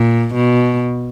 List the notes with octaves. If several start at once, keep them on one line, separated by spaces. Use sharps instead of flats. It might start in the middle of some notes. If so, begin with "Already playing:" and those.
Already playing: A#2
B2